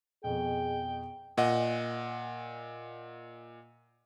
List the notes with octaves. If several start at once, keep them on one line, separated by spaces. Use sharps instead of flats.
F2 B2 G#4 G5
A#2 D#5 F#5